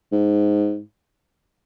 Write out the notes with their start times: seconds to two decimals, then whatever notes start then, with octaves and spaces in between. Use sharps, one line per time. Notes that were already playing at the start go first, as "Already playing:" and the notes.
0.12 G#2